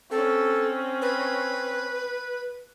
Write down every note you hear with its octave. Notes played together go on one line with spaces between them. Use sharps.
C4 C#4 A4
B4